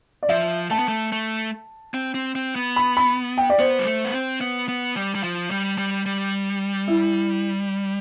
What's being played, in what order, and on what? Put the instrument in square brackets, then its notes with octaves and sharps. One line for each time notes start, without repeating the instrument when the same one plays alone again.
[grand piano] D5
[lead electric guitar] F3 [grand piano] E5
[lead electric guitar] A3 [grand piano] A5
[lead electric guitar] B3
A3
A3
C4
C4
C4
B3
[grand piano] B5
B5
G5
D5
[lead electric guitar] B3 [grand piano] C5
[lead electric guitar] G3
A3
B3
C4
B3
B3
G3
G3
F3
G3
G3
G3
[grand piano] E4